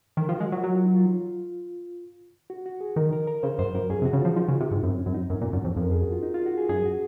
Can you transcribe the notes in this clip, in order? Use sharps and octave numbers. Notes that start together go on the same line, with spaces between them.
D#3 A#4
F3
G#3 F#4
F#3 F4
F#3 F#4
F4
D#4
F4
F#4
F#4
G#4
D#3 A#4
A#4
A#4
C#3 C5
F#2 C5
F#2 A#4
F#2 G#4
C3
F#4
C#3
F3 F4
F3 D#4
C#3
C3
G#2
F#2 C4
C#4
F#2
D#4
F#2 C#4
A#2
F#2
F2
F2
A#4
G#4
F#4
F4
D#4
F4
F#4
G#4
F#2 G#4
F#4